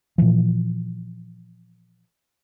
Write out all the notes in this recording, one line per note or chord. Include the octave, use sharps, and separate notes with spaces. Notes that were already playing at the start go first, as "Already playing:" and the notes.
A#2 C#3 E3 F3